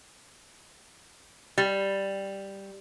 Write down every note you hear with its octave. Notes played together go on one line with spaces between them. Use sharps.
G3